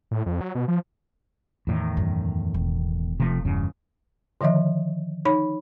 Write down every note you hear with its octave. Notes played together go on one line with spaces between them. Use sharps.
A2
F2
F#3
B2
F3
E2 A2 D#3
F#2
E1
C3 F3 A3
E2 G2 C#3
D3 D#3 F3 D#5 E5
D#4 C#5 B5